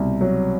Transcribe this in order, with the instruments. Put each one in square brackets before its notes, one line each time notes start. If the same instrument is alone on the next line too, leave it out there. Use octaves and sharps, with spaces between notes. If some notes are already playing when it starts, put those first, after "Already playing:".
Already playing: [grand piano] C2 B2
F#3